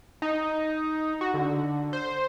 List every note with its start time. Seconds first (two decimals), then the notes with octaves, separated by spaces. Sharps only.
0.22 D#4
1.21 F#4
1.34 D3
1.93 C5